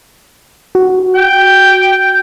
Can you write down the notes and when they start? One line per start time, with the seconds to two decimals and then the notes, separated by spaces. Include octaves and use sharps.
0.75 F#4
1.15 G5